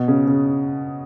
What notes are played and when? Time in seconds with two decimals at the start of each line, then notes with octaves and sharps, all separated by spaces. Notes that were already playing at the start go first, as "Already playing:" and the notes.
Already playing: B2
0.08 C#3
0.28 C#3